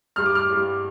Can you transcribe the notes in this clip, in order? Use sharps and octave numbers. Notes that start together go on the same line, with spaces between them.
G2 G3 F6
D6
F6
G2 G3